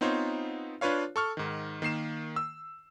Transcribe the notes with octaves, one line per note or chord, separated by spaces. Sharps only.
B3 C4 D#4 F4 C5 C#5
D4 F4 B4 C#5 F5
A4 C#6 F6
G#2 D#3
D#3 A#3 C7 E7
E6